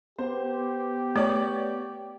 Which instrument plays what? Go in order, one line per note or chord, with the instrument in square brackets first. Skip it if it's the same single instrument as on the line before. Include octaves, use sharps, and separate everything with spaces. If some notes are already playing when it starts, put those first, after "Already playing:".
[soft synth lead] B3 [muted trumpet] G4 [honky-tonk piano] C5
[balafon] A3 [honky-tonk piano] C#5 D5 D6